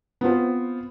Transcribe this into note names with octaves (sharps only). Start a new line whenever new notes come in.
B3 C4 F4 C5